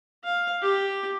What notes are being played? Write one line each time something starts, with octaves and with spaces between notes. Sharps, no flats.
F5
G4